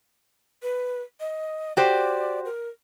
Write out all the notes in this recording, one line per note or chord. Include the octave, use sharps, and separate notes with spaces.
B4
D#5
F#4 G4 C5 D5
A#4